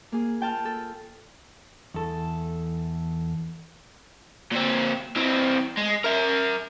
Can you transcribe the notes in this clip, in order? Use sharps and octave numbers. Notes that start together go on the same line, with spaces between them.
A#3 G#4
F4 G5 A5 F6
A4
E2 A4
A#2 C4
E3 C4
G#3
A#4 E5